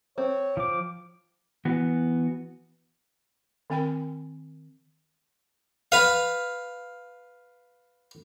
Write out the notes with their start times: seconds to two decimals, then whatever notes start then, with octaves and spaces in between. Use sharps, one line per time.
0.18 C4 C#5
0.57 F3 D6
1.65 E3 B3 F#4
3.70 D#3 C4 A#4 G5 G#5 B5
5.92 B4 F5